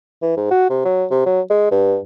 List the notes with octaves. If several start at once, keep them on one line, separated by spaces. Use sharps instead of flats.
E3
G#2
F#4
C3
F#3
C3
F#3
G#3
G2